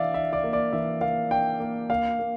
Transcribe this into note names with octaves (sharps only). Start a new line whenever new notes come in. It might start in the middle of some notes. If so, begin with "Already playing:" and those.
Already playing: E3 D4 D5 E5 F5
D4 E5
D5
A#3
D5
E3 E5
A#3 F5
D4 G5
A#3
A#3 F5
A#3